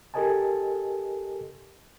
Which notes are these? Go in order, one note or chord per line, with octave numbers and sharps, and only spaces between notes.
G4 A4 A#4 D#5 G#5 A5